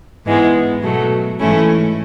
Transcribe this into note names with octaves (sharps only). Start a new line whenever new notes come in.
G#2 E3 G#3 B3
B2 F#3 A3
G#2 E3 A3 C#4 E4